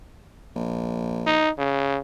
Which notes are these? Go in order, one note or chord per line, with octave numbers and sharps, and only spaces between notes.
A#1
D#4
C#3